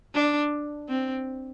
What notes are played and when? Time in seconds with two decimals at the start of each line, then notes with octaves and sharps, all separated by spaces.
0.14 D4
0.88 C4